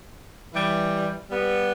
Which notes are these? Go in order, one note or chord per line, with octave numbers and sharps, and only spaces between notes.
E3 G3
G3 B3